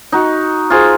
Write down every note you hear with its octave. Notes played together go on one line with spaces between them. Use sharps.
D#4 F#4
F4 G#4 C5